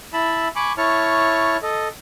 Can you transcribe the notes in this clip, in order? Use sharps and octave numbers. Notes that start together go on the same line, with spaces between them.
E4 E5 A5 B5 E6
G#5 B5 C#6 D6
E4 C#5 A5 C#6 F6
A4 D#5